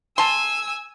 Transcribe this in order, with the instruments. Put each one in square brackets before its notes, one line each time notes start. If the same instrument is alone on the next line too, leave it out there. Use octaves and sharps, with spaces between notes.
[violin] G#5 E6 [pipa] A5 C6